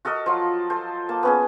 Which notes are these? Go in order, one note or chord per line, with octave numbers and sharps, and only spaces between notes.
F#4 A4 A#4 D#5
F3 F#3 F4
A4 C5
A#3 A5
B3 C#4 G#4